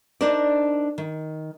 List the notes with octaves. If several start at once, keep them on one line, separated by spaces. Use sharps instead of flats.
D4 D#4 A#4 C5 D5
D#3